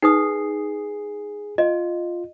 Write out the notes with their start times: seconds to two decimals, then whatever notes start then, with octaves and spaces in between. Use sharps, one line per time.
0.02 D#4 G#4 B4 D#6 C7
1.58 F4 D#5